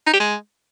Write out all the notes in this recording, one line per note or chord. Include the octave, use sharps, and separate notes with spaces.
D#4
G4
G#3